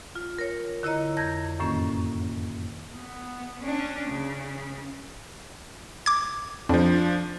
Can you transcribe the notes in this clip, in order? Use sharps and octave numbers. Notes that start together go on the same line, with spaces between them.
F4
A#4 C#5
D3 E4 C#5 D#5 A#5
F2 G6 G#6 A#6
F#2 A2 D#3 A#3 C#4
B3
C#4 D4
C#3
D6 G#6
F2 F3 D4